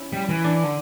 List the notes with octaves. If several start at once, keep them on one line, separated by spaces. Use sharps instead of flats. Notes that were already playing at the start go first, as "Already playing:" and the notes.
Already playing: C#4 E4
G3
E3
D4
D3